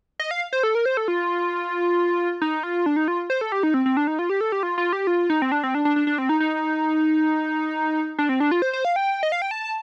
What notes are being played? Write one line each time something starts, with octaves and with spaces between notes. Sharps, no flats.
D#5
F5
C5
A4
A#4
C5
A4
F4
D#4
F4
D4
D#4
F4
C5
A4
G4
D#4
C4
C4
D4
D#4
F4
G4
A4
G4
F4
F4
G4
F4
D#4
C4
D4
C4
D4
D4
D4
D4
C4
D#4
D#4
D4
C4
D4
F4
C5
C5
F5
G5
D#5
F5
G5
A5